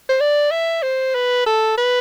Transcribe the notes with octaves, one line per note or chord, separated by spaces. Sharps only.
C5
D5
E5
C5
B4
A4
B4